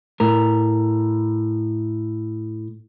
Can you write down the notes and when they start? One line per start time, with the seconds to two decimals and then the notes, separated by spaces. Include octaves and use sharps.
0.20 A2 A#4